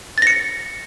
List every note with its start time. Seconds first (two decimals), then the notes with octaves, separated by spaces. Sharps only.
0.18 A6
0.22 A#6
0.27 C#7